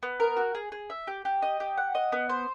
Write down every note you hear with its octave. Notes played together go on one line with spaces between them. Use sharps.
B3
A#4
F#4
G#4
G#4
E5
G4
G4
D#5
G4
F#5
D#5
B3
C5